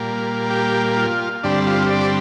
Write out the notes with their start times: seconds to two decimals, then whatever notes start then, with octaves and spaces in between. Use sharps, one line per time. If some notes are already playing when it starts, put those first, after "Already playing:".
Already playing: A#2 G3 A#3
0.50 G4
0.97 F4
1.43 G2 D3 G3 C4 D4
1.67 F4
1.90 D5